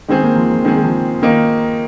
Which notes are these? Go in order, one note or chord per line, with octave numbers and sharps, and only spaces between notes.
D#3 G#3 C4 G#4
A#3
F3
F3
D#3 G#3 C4 G#4
G#3
F3
D#3 A#3 D#4